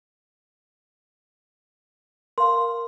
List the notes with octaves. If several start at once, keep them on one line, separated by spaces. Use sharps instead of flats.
A#4 F5 C6